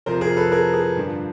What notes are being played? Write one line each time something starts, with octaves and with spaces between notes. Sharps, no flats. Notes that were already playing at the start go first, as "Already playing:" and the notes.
F2 C3 F3 A#4 C5
G#4 A#4
A4 B4
G#4 A#4
G#4
G2 D3 F3